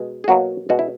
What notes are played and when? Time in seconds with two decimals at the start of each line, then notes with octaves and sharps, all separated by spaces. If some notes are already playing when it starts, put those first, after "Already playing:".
Already playing: B2 G#3
0.24 G#4
0.28 B2 F#3 A#3 F#4
0.69 B2 G#3 F#4
0.79 E4